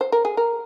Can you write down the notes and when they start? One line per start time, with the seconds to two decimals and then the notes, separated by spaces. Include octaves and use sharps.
0.01 C5
0.12 A#4
0.25 G#4
0.37 A#4